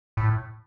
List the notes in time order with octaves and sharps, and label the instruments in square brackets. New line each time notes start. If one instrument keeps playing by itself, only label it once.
[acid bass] A2